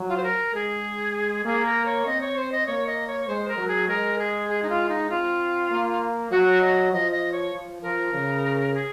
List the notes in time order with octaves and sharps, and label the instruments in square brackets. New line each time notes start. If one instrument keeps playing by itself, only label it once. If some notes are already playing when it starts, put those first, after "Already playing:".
Already playing: [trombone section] F#3
[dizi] F4
C5
A#4
[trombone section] G#3 [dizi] G#4
[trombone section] A#3 [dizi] G#4
[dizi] A#4
C#5
[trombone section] C4 [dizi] D#5
[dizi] C#5
C5
D#5
[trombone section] A#3 [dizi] C#5
[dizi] D#5
C#5
[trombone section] G#3 [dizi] C5
[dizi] A#4
[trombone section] F#3
[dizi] G#4
[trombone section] G#3 [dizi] A#4
[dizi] G#4
G#4
D#4
F4
D#4
[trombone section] C4 [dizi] F4
[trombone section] A#3
[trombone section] F#3 [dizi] F#4
[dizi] D#5
[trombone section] F3 [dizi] D#5
[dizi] D#5
C#5
[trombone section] F3
[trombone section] F3 [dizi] A#4
[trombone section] C#3
[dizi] G#4